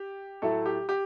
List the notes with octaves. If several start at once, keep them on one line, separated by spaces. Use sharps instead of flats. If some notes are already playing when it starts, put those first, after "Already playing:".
Already playing: G4
A2 F#3 A3 E4 A4
G4
G4